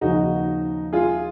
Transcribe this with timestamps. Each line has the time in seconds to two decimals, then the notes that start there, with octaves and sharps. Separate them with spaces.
0.01 D#2 C#3 F3 D#4 F#4
0.93 F4 G#4